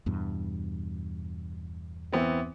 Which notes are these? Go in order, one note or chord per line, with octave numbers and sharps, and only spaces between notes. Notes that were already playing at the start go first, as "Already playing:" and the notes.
E2 G2 B2
E3 B3 C4